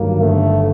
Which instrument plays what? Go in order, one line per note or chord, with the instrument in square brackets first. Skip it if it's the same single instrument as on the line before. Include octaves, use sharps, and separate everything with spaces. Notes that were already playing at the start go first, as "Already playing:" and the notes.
Already playing: [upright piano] G1 G2 D#3 F#3 [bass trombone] A#3
[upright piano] G1 [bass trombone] A3